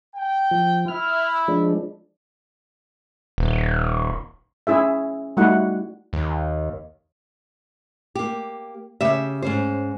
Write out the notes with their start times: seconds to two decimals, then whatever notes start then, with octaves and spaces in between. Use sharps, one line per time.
0.15 G5
0.51 F3
0.88 E4 F6
1.48 F3 G#3 D4
3.38 D#1
4.67 C#4 E4 G#4 E5
5.37 G3 A3 D#4 E4 F#4 F#5
6.13 D#2
8.15 A#3 G4
9.01 C#3 G4 E5
9.42 G#2 C#4 C5